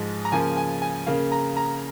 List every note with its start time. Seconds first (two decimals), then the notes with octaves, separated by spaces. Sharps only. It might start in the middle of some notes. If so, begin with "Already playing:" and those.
Already playing: G#2 F3 G#3 D#5
0.25 A#5
0.32 C#3 F3 A#3 G#5
0.57 G#5
0.82 G#5
1.07 C#3 A#3 F5
1.32 A#5
1.57 A#5